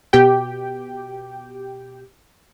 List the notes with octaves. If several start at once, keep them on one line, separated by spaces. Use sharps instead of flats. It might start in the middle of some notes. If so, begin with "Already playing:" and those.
B2 G4 G5